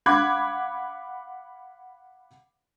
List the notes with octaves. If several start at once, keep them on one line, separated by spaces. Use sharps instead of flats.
F5 F#5 B5 D6 F#6 G#6